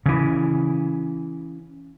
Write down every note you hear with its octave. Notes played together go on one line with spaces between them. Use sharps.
C#3 E3